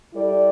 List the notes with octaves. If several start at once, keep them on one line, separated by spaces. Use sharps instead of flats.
G3 E4 A4 D5